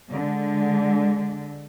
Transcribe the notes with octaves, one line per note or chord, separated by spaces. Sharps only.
D3 G#3